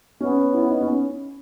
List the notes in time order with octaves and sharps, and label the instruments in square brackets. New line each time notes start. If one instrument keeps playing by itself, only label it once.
[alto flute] B3 [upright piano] C#4
[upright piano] E4
D#4
C#4